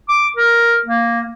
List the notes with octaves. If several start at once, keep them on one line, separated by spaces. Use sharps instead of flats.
D6
A#4
A#3